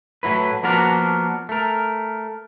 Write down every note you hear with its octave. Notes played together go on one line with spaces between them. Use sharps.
A2 F#3 E4 B4
F3 A#3 B3 D4 F#4 A#4
A3 A#4